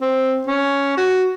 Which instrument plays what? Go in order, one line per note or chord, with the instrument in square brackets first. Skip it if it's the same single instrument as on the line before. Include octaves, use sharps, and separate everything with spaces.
[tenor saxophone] C4
C#4
F#4